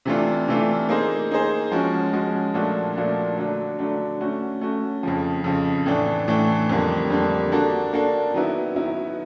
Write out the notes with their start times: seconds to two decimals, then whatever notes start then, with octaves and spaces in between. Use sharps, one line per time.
0.05 C3 E3 A3 D4 F4
0.48 C3 E3 A3 D4 F4
0.89 A#3 D#4 G#4 C5
1.30 A#3 D#4 G#4 C5
1.72 F3 G#3 C#4 F#4
2.13 F3 G#3 C#4 F#4
2.54 A#2 F3 A3 D4 F#4
2.96 A#2 F3 A3 D4 F#4
3.37 D3 F#3 A3 D4
3.79 D3 F#3 A3 D4
4.21 A3 C#4 F#4
4.61 A3 C#4 F#4
5.03 F2 C#3 F3
5.44 F2 C#3 F3
5.86 A2 E3 A3 D4
6.28 A2 E3 A3 D4
6.69 F2 D3 G3 A#3
7.10 F2 D3 G3 A#3
7.52 A#3 D4 F#4 A4
7.93 A#3 D4 F#4 A4
8.34 D#3 F#3 B3 E4
8.76 D#3 F#3 B3 E4